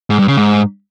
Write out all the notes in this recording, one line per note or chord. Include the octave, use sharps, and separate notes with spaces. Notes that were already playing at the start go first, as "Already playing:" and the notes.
G#2
G2
C#3
G#2